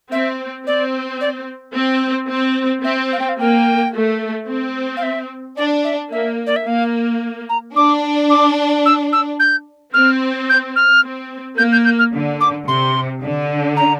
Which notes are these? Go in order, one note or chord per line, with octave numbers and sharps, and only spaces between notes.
C4 E5
C4 D5
D5
C4
C4
C4 E5
F5
G5
F5
A#3 G5
A3
C4
F5
E5
D4 D5
E5
A#3 E5
D5
E5
A#3 F5
A#5
D4 D6
D6
E6
E6
G6
C4 F6
G6
F6
C4
A#3 G6
G6
G6
F6
D3
D6
C3 C6
D3
A#5